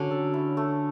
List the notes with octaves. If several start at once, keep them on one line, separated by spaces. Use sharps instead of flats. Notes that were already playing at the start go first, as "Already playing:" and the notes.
Already playing: D3 F#3 C#4 C#5
A4
E4
A3